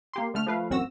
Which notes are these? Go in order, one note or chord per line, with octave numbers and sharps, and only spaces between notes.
A#3 G4 C6
D3 A3 F6
F3 A3 B4 F5
A1 F#2 C4 F#4 E6 A#6